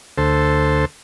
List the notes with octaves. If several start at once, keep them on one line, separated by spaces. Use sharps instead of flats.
D2 A4 C5